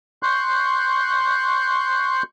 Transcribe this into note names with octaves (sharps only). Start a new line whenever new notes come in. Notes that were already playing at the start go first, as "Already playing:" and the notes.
C6 C#6 F#6 G6